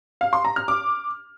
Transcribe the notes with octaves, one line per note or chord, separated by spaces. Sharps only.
F5
C6
A#5
F6
D6